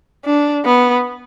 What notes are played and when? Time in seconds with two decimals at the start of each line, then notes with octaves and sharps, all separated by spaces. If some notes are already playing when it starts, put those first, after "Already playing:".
0.24 D4
0.65 B3